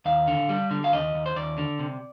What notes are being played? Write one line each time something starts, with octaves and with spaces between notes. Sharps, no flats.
D#2 F5
D3
G3
D3
F5
D#2 D#5
D#2
C5
D#2 D5
D3
C3